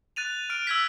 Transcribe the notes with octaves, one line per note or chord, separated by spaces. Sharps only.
F#6 A6 D#7 F7
F6 D7
E6 G#6 B6